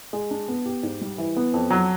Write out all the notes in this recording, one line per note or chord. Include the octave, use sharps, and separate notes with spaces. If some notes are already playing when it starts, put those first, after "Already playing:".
G#3
D4
B3
G4
G#2
G3
E3
B3
F2
F#3